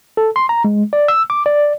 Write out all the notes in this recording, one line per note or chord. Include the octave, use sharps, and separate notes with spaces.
A4
C6
A#5
G#3
D5
E6
D6
D5